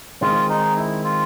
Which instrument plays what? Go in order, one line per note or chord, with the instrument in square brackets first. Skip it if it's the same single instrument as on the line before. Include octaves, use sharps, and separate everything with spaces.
[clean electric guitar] D#3 G#3 C4 [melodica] F4
[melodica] D#4
E4
F4